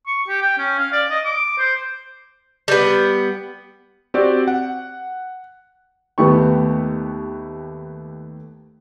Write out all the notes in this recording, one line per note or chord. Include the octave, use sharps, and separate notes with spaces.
C#6
G4
G5
C#4
F5
D5
D#5
D6
C5
G3 B3
C4 F#4 G4 D5
F#5
D#2 A3 B3 G4 C#6